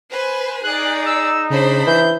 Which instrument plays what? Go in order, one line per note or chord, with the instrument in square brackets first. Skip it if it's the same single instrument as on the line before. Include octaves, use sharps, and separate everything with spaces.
[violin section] B4 C5 G#5
[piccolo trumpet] D#4 [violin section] G#4 D5 [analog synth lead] F#6
[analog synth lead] E6
[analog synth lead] C#3 [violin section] D4 C5 B5
[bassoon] E3 [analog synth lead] G6